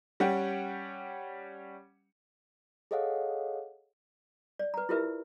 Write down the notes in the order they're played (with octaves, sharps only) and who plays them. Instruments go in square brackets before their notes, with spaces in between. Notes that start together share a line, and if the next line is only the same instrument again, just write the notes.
[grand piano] G3 C#4 F#5 G5
[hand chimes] G#4 A4 C#5 D#5 F5 F#5
[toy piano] D5
B4 A#5
E4 F4 G4 A#4 B4 E5